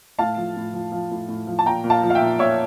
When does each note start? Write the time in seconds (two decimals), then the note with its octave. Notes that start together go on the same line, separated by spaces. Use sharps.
0.19 A2 F5 A5
0.37 F3
0.56 A2
0.74 F3
0.92 F3
1.11 A2
1.29 A2
1.47 F3
1.59 A5
1.66 A#2 G5 A#5
1.84 A#2
1.90 F5 A5
2.03 F3
2.10 F5
2.15 E5 G5
2.21 A#2
2.39 A#2 C#5 E5